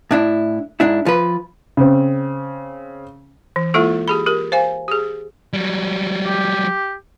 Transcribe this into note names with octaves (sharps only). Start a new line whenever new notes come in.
A2 D4 E4
G#2 D4 E4
F3 B4
C#3 C4
E3
G#3 A#3 E4 F4 A4
G4 G#4 B5
G4 A#4
C5 F5 G#5
G4 G#4
F#3 G3
G4